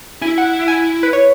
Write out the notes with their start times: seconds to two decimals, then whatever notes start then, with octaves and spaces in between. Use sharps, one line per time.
0.22 E4 G#5
0.38 F#5
0.68 G#5
1.03 B4
1.13 C#5